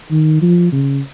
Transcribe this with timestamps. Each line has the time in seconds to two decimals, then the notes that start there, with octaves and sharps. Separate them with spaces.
0.11 D#3
0.42 F3
0.72 C#3